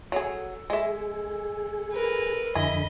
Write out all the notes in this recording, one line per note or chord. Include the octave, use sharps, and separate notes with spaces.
F#3 G#4 A4
G#3 G#4 E5
A#4 B4
F2 D3 E4 G#4 D#5 B5